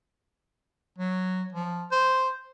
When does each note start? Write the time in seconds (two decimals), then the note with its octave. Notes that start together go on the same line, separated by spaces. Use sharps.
0.98 F#3
1.52 F3
1.92 C5